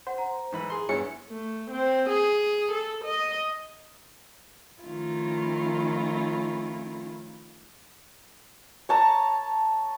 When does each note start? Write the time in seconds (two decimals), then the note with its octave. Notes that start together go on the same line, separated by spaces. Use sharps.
0.07 C5 F#5
0.18 A#5
0.52 G#2 E3 B5
0.70 G#4 C6
0.89 G2 B3 E4 G#4 C#5 C#7
1.30 A3
1.71 C4
2.09 G#4
2.71 A4
3.05 D#5
4.83 D#3 F3 A3 C#4 E4 F4
8.89 C#5 A5 A#5